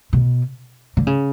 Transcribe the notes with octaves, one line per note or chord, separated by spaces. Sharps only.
B2
D3
C#3